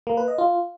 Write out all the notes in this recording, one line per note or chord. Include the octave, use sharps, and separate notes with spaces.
A#3
B4
D#5
F4